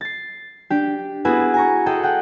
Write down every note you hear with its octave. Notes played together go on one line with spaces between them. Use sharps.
A6 C7
D4 G4
B3 E4 F#4 G#4 B4
G#5 A#5 C#6
G#4 A4 D#5 G5
F#5 G5